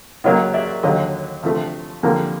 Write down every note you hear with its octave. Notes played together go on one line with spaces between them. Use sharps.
C#2 C#3 F#3 A#3 D#5 F5
D5 E5
D#2 D3 F#3 D#5 F5
D2 C3 F3 A3
F2 D3 G3 A#3